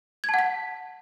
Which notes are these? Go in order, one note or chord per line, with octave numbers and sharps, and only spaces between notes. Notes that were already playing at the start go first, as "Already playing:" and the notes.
F#5 A5 G#6 B6